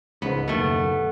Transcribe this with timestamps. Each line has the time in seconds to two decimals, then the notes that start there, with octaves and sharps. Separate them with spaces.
0.22 C#2 G#2 B3
0.48 F#1 D#2 B2 A3